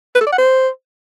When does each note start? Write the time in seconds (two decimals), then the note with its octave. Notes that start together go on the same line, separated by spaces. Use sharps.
0.15 B4
0.21 A4
0.26 D5
0.32 F#5
0.38 C5